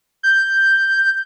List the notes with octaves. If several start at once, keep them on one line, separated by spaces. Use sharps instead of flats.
G6